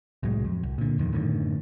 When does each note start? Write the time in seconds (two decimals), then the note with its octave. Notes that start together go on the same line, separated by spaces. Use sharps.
0.23 C2 A2 F#3 G#3
0.44 F2
0.63 C2
0.78 A#2 D3
0.98 D#1 F2 D#3
1.13 F#2 A2 D3 D#3